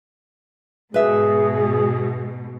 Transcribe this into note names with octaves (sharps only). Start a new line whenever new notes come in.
G#2 B2 G#4 B4 E5